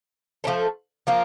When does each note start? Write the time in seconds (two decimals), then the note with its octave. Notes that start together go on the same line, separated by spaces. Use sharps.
0.44 F3 A3 D4 A4
1.07 F3 A#3 F4